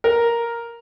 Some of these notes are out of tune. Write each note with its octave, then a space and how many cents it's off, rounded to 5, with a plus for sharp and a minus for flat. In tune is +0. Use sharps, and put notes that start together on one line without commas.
A#4 +5